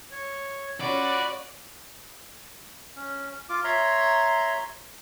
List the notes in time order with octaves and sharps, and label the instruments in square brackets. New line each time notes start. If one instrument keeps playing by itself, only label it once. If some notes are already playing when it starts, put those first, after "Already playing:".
[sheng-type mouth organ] C#5
[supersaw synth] C#4 F4 C#5 [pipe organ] F#4 B4 [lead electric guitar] D5 [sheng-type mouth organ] C6
[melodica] C#4
F4 D6
C#5 E5 A#5 C6